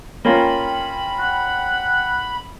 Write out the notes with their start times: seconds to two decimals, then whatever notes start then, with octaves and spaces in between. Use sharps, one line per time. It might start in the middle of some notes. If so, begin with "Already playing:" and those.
0.25 A#3 C#4 F4 G5 B5
1.20 F#5